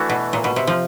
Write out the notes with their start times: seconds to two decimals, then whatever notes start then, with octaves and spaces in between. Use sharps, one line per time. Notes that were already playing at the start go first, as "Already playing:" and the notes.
Already playing: E3 A3 D4 F#4
0.09 B2
0.33 A#2
0.44 B2
0.56 C3
0.67 F3